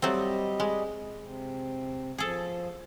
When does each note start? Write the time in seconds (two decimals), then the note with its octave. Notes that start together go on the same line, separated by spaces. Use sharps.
0.02 F#3 G3 A3 C4 G4 D#5
0.60 G#3
1.21 C3
2.18 F3 G#4 A4